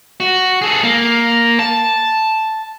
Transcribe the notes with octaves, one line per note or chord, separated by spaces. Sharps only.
F#4
G#4 A4
A#3
A5